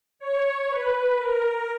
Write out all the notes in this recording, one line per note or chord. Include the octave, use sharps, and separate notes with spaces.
C#5
B4
A#4